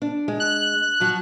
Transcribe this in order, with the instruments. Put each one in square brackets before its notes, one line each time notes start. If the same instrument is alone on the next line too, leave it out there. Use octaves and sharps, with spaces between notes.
[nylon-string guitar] D4
G#3
[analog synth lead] F#6
[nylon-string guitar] F3 F#3